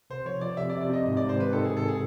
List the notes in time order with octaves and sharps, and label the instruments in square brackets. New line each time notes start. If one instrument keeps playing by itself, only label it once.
[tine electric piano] C3 [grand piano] C5
[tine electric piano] F3 [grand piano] C#5
[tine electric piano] F3 [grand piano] D5
[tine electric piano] C3 [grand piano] E5
[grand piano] D5
[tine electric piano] C3
[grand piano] D5
[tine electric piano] C3 [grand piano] D#5
[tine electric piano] G#2 [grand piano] D#5
[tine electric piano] G#2 [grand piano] D5
[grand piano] C5
[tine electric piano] D#3 [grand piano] B4
[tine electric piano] D#3 [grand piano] A4
[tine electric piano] D#3 [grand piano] G#4
[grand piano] A4
G#4